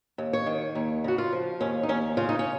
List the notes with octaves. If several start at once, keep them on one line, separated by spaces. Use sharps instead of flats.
D#2
C#5
D#3
D#2
C#3 F#4
F4
F3
D#2 C#4
D#4
D#2 C#4
C#3 F4
D#4
C#4